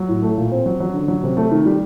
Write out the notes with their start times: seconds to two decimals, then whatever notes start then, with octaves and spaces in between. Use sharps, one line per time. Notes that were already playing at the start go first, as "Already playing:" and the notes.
Already playing: F#3
0.08 A2
0.23 A3
0.37 A#2
0.51 C4
0.66 F#3
0.80 F#3
0.94 D3
1.08 F#3
1.23 C3
1.37 A3
1.51 D#3
1.66 G3